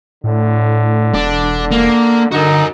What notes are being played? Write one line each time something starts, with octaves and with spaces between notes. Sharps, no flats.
A2 D3
E1 D4
A#3
D3 D#4 F#4 A#4